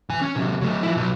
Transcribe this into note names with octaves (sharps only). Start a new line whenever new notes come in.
E3 G#5
C#4
C3 F#3
F#3 A3
F3 E4
B2 F#3